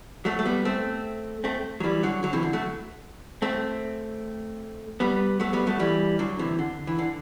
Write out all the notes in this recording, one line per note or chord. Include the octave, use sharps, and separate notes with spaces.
F#3 A3
A3
G3 B3
A3 C4
A3 C4
F#3
E3 G3
D3 F#3
D3 F#3
C3 E3
D3
F#3 A3
A3 C4
G3 B3
F#3 A3
G3 B3
F#3 A3
E3 G3
D3 F#3
C3 E3
D3
E3
D3